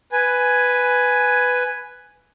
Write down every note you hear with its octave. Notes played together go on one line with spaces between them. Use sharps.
B4 G#5